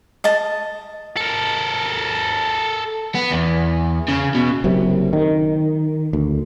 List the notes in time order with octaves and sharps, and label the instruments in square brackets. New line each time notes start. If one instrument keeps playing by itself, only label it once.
[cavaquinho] D#5 A5
[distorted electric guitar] A4 A#4
[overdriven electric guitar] B3
E2
C#3
B2
[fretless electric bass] F#1 F#2 C3
D#3
D2